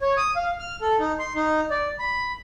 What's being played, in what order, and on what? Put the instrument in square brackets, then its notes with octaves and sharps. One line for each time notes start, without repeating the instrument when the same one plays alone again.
[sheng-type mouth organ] C#5
D#6
F5
F6
A4
D#4
C6
D#4
D5
B5